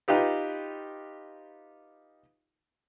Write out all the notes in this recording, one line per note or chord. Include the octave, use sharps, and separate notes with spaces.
D#4 F4 G4 B4